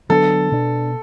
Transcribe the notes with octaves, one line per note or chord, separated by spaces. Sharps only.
D3 F#3 B3 D4 A4
B2 B3 D4